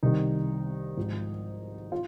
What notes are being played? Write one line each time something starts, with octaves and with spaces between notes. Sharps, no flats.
C2 C3 D#3 D#4
G#1 G#2 F3
F4